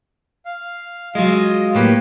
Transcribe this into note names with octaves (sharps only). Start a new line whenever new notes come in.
F5
F#3 G#3 F4 D#5
A2 A#3 G4 B4 C#5